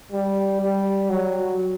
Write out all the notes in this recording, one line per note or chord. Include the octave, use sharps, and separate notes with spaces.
G3
G3
F#3